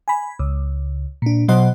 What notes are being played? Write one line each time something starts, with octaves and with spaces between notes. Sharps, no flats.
G#5 B5
C#2
A#2 D4
B2 F#3 C5 D#5 F#5 C6